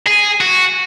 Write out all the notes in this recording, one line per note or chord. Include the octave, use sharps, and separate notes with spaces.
G#4
F#4